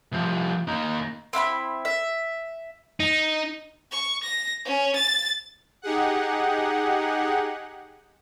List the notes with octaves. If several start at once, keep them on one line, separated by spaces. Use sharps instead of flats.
C2 F3
A#3 D#4
C4 E4 F#5 B5
E5
D#4
C#6
A#6
C#4
A6
D#4 G4 G#4 F#5